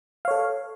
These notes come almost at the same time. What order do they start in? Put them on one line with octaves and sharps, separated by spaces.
F5 C#5 A4